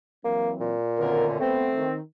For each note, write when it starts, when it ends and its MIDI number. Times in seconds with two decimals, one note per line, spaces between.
0.25 0.75 52
0.25 0.75 54
0.25 0.51 58
0.25 0.75 60
0.61 1.36 46
0.98 1.38 42
0.98 1.38 47
0.98 1.38 50
0.98 1.28 51
0.98 1.28 60
0.98 1.28 70
1.40 1.85 57
1.40 1.67 59
1.40 1.92 60
1.75 1.99 51